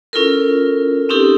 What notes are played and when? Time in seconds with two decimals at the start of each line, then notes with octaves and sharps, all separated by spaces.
0.13 C#4 E4 F4 A4 A#4
1.09 C4 C#4 D#4 E4 G4 A4